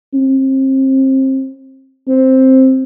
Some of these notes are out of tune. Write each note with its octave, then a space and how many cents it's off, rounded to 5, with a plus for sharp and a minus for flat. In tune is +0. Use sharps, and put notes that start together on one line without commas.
C4 +30
C4 +5